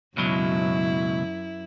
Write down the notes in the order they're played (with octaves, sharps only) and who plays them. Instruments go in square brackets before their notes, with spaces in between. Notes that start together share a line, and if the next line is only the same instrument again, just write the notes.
[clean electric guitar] C#2 B2 F#3 [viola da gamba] F#2 E4